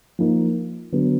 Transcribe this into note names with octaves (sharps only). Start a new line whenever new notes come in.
F3 A#3 D#4
D3 F#3 B3